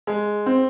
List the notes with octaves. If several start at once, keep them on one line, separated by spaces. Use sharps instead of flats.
G#3
C4